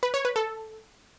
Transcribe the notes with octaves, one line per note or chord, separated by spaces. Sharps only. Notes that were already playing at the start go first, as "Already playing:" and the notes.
B4
C#5
B4
A4